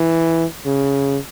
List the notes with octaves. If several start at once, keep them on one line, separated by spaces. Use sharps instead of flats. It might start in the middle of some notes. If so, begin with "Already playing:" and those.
Already playing: E3
C#3